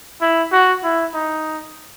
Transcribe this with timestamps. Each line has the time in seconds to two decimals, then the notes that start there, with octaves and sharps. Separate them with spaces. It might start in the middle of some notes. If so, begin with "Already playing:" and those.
0.21 E4
0.52 F#4
0.84 E4
1.14 D#4